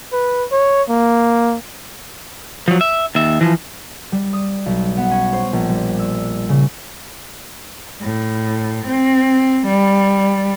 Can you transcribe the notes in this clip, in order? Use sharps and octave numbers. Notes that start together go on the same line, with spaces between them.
B4
C#5
A#3
F3 F#3
E5
D#2 E5
E3 F3
G3
D#6
B1
B3
C#4
C5
A#1
G3
E6
C#3
A2
C4
G3